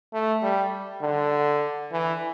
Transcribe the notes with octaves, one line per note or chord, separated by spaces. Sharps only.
A3
G3
D3
E3